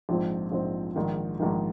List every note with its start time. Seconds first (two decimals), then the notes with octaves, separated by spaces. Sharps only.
0.09 A#1 G#2 F3 C4
0.52 A#1 G#2 F3 C4
0.96 A#1 G#2 D#3
1.40 A#1 G#2 D#3